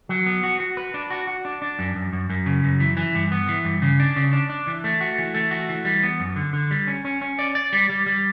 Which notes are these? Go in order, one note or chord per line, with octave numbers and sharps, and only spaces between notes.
F#3
B3
F#4
F#4
B4
D4
F#4
F#4
D4
D4
F#2
F#2
F#2
F#2
C#3
F#2
E3
E3
G2
B3
E3
G2
C#3
D4
C#3
D4
D4
E3
A3
F#4
E3
A3
F#4
E3
G3
B3
F#2
D3
D3
G3
C#4
C#4
C#4
D5
D5
G3
G3
G3